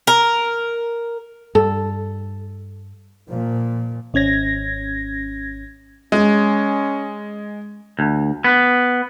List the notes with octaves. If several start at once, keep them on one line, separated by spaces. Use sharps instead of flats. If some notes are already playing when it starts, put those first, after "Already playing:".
A#4
G2 A4
A#2 F3
G#1 C#4 G#6 A#6
G#3 C#4
D2
B3